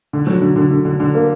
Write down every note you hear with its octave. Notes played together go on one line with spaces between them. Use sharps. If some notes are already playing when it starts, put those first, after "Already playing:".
D3
F#3
D3
D3
D3
D3
D3
A#3